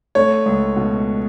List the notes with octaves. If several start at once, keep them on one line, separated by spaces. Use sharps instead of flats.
A3 C#5
C#2
B2